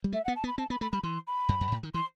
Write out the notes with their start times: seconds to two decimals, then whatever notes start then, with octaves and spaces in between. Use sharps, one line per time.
0.04 G3
0.13 A3 E5
0.24 F#5
0.28 B3
0.35 A5
0.44 B3
0.47 B5
0.58 C4 A5
0.70 B3 B5
0.81 A3 B5
0.92 G3 B5
1.03 E3 C6
1.27 B5
1.49 F#2
1.61 F#2
1.72 A2
1.83 D#3
1.94 E3 C6